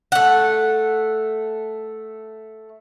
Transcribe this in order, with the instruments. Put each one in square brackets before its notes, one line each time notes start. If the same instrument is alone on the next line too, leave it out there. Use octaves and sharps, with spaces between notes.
[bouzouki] A3 F#5